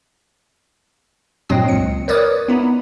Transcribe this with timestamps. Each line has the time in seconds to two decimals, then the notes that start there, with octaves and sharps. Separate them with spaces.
1.49 G2 A#2 F#3 C4 D#5 D#6
1.68 C#2 C#7
2.08 A#4 B4 C#5 D5 D6 D#6
2.48 B3 D#4 E4